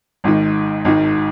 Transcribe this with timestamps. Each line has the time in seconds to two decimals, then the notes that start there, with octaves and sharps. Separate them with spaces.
0.24 G#1 G#2 D#3
0.85 G#1 G#2 D#3